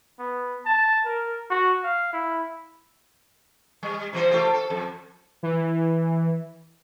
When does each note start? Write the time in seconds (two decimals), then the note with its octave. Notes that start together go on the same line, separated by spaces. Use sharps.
0.19 B3
0.65 A5
1.06 A#4
1.50 F#4
1.84 F5
2.13 E4
3.83 G3
4.13 C3 E3 C5
4.31 A3 F4 G4
4.54 A4
4.70 F2
5.43 E3